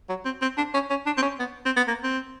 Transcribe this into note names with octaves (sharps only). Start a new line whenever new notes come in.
F#3
C4
C4
D4
C#4
C#4
D4
C4
C#4
B3
C4
B3
A#3
C4